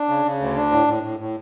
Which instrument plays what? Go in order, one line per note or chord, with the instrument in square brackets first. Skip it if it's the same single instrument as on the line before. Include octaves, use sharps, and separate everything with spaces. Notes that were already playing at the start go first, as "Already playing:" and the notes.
Already playing: [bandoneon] D4
C#3
C#3
D2
D4
A2
A2
A2
A2